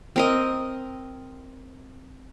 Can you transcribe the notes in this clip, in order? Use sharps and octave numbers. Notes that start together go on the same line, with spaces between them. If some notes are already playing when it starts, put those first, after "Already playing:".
C4 A#4 D#5